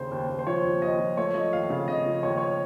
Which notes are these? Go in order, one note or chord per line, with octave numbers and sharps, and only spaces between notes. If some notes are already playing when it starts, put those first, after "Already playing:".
Already playing: D#2 C#3 C5
D#2
D#2
C5
F3 C#5
D#2
D#2 D#5
F3
A3 C#5
F3 D#5
D#2 F5
C#3 F5
C#3 D#5
F3
D#2 C#5
D#5
C#5